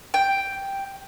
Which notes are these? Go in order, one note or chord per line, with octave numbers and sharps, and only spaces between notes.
G5